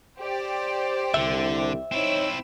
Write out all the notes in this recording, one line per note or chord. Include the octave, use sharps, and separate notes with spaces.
G4 C5 D5
C2 D3 E5
C4 D#4 E4 C5 C#5 E6